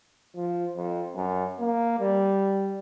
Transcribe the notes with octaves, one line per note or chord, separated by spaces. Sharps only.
F3
F2
F#2
A#3
G3